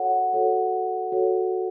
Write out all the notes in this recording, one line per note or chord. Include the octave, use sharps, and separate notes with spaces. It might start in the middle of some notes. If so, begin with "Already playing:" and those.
Already playing: F#4 A4 C#5 F#5
F#4 A4 C#5
F#4 A4 C#5